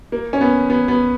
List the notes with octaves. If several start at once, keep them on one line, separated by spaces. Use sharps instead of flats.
A#3
C#4
B3
B3
B3